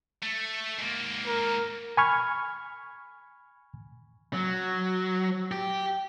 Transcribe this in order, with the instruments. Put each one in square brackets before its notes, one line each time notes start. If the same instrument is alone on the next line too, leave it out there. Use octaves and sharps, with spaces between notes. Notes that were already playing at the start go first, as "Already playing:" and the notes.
[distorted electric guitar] A3
G#2 A#3
[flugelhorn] A#4
[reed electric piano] G#5 B5 C#6 F6 G#6
[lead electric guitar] F#3
G4